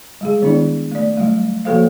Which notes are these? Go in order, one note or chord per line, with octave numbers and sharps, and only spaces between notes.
G3 G#3 G#4
D#3 B3 D4 E4 D5
A3 D5
F#3 G3 A3
F3 A#3 F#4 A4 C5 F5